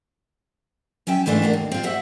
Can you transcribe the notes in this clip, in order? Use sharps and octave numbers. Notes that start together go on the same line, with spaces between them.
F#3 C#4 E5 G5 A5
G#2 E3 A3 D4 F4
A#3 D4 F#4
D#2
C4 F4
F#4 E5 F#5